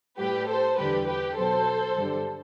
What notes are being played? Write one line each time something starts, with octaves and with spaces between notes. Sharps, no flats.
A2 G3 G4 B4
A4 C5
E2 D3 G3 G4 B4
G4 B4
B2 F#3 A4 C5
G2 D3 G3